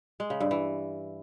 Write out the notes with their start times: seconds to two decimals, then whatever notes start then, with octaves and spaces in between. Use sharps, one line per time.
0.20 G#3
0.30 C#3
0.40 G2
0.51 E3